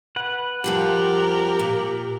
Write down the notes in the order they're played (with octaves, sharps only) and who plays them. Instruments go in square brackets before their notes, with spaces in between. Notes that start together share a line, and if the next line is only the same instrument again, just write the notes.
[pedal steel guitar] B4 F#5
[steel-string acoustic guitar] F2 F3 G3 [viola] G4 A#4 [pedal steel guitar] F#5
[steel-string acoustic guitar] A#2